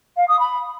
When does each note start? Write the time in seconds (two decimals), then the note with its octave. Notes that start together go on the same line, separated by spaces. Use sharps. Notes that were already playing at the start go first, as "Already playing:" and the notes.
0.16 F5
0.28 D#6
0.39 B5